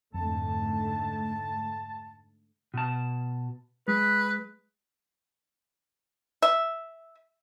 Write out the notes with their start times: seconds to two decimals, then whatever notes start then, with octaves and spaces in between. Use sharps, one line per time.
0.14 F2 G#2 D3 A3 A5
2.74 B2 A5
3.88 G#3 B4
6.42 E5